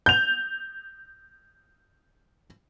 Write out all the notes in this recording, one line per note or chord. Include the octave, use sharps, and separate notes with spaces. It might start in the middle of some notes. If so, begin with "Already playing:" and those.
G6 F7